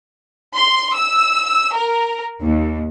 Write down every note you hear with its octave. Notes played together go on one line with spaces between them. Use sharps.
C6
E6
A#4
D#2